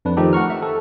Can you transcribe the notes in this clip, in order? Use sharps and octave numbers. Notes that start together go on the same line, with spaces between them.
F2 D4 B4
D#3 F3 A3 D#4 G4 A4
F#5 A#5 C#6 F6
E5
A4